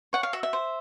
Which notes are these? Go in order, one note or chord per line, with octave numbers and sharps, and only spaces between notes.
C#5 F#5
F5
F#4 E5
E5
C5